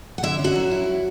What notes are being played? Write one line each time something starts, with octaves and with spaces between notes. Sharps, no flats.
F#5
D3 E4 E5
C#4
F#4 F#5
F#3
E4